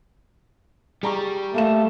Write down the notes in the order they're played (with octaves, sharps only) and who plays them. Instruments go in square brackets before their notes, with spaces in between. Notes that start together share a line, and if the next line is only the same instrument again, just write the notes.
[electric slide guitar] G3 [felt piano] G#4 A#5 C#6
[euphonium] A3 [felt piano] A#3 F5 E7